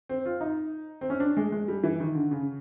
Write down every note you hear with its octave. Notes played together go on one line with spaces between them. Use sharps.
C4
F4
D#4
C4
C#4
D4
G#3
G#3
G3
E3
D#3
D3
C#3